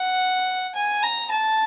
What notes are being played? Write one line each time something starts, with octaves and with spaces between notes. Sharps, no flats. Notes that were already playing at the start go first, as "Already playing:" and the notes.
Already playing: F#5
G#5
A#5
A5